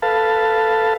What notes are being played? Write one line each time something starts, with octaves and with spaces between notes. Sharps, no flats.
A4 B4 F5 A5